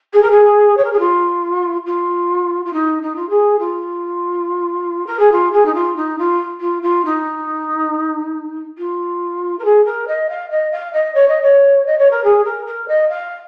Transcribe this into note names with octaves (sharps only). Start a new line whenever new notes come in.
G#4
A#4
G#4
C#5
A#4
G#4
F4
F4
F4
D#4
D#4
F4
G#4
F4
A#4
G#4
F4
G#4
D#4
F4
D#4
F4
F4
F4
D#4
F4
A#4
G#4
A#4
D#5
F5
D#5
F5
D#5
C#5
D#5
C#5
D#5
C#5
A#4
G#4
A#4
A#4
D#5
F5